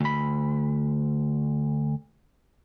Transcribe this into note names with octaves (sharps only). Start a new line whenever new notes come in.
D2 B5